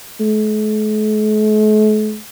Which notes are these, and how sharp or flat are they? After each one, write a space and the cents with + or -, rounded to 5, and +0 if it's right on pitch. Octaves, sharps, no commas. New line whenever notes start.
A3 -45